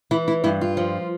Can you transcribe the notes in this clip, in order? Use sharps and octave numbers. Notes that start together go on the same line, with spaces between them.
E3 E4
E4
G2 E4
F4
F3